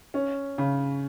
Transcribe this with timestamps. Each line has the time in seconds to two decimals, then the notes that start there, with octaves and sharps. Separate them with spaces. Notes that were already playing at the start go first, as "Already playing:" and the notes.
0.14 C#4
0.58 C#3